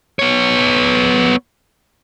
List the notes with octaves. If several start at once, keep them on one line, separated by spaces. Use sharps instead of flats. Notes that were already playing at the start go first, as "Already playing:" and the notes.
B3 C#5